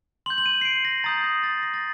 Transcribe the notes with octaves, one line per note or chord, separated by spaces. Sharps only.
C6 G6 F#7
F#7
D#7
C7
D7
A#6
A#5 D#6 G6 A6
A#6
A6
A#6
A6